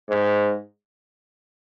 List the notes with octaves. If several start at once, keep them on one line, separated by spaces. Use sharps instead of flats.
G#2